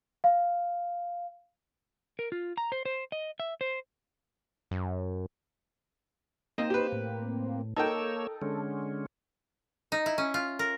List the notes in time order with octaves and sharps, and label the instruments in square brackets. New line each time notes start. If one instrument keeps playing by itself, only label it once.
[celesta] F5
[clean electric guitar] A#4
F4
A#5
C5
C5
D#5
E5
C5
[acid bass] F#2
[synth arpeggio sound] A#3 C4 [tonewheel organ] D#4 C5 [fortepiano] D#5
[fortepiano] G4 B4
[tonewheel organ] A2
[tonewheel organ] A#3 C#5 E6 [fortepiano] D#4 A#4 G5 [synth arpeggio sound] A4
[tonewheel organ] D3 G#3 C#4
[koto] D#4
E4
C#4
F4
A#4